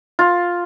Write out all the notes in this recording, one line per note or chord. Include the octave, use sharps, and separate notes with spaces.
F4